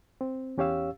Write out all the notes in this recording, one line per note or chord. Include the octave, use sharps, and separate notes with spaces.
C4
E2 C#4 G4 C#5 F5 E6